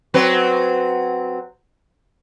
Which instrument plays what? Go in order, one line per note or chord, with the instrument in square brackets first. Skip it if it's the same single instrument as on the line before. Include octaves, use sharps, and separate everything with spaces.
[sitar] F#3 C4 B4